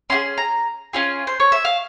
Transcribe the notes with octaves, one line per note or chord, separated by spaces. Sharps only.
C#4 F4 G#4 C6
A#5
C#4 F4 G#4
C5
C#5
E5
F5